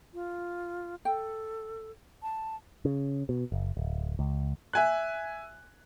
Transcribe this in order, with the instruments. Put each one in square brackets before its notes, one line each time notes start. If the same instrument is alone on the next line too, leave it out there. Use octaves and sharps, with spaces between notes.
[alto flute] F4
[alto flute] A4 [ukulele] G5
[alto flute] A5
[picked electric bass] C#3
B2
F#1
D1
C#2
[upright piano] E5 G#5 F#6